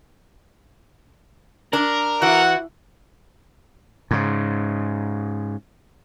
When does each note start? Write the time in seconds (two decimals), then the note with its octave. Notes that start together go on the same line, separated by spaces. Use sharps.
1.73 D4 A#4
2.22 E3 F#4 F#5
4.11 G#2 C#3